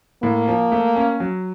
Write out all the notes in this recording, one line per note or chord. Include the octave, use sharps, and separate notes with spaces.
A2 A#3
F3
A3
C#4
F#3